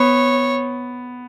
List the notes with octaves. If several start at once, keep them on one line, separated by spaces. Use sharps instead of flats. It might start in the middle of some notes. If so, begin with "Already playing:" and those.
Already playing: B3 C#5